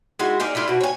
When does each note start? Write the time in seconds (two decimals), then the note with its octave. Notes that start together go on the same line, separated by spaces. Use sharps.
0.19 G#3 D#4 E4 F#4
0.40 D#4 G#4 A#4 D5
0.55 A3 D4 E4 F4
0.68 B2 F#4
0.81 C#5 G#5